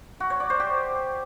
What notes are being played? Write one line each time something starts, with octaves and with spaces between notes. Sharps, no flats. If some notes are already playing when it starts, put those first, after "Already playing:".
F#4
C#5
D5
C5
G4